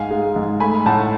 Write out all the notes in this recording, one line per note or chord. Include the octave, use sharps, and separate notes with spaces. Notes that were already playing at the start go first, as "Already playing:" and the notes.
Already playing: G#2 F5 G#5
G#3
G#2
A3 G#5 B5
A2 F#5 A5